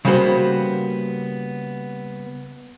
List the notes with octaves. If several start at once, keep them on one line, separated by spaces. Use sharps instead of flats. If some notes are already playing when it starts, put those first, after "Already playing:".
C#3 G3 A#3 B3 F#4 C5